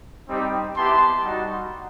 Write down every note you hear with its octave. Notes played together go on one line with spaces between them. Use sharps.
G3 C4 D#4 G4
B3 E4 G4 A5 C6
G3 D#4 F#4